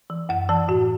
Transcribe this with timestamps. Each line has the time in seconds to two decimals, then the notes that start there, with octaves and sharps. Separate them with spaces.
0.10 E3
0.29 F#2 F#5
0.49 E3 A5
0.68 A2 F#4